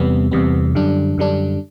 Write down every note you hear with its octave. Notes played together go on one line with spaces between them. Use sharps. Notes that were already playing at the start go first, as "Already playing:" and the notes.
Already playing: E2 C3 G3 B3
E2 C3 G3 B3
F#2 D3 G3 D4
F#2 D3 G3 D4